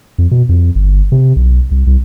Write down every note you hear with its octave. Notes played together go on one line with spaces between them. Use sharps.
F2
B2
F2
G1
C3
B1
C2
C2